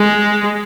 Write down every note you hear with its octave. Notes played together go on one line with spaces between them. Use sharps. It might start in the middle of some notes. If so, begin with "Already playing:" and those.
Already playing: G#3